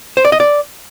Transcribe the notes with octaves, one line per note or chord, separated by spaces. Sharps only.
C5
D5
D#5
D5